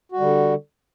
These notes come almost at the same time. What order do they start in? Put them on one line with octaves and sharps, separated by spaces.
F#4 G3 D3